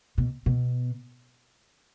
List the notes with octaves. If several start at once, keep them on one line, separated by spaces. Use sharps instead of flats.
B2
B2